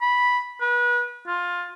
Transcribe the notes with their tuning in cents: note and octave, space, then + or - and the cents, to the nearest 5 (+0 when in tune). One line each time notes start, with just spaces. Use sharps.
B5 -5
B4 -30
F4 +15